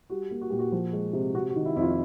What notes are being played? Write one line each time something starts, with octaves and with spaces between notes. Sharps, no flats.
G3 F#4
A#3
F#4
A#2 G4
F#4
F3
G#3
C3
C3 F#4
F#4
D#3
E4
F2 E4
F4